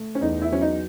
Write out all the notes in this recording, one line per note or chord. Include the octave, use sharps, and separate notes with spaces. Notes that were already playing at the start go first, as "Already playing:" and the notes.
Already playing: A3
C#4
E2 D#4
E4
F#3 C#4
D#4